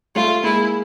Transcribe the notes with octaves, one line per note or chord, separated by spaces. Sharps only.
G3 A3 F4
G#3 A#3 E4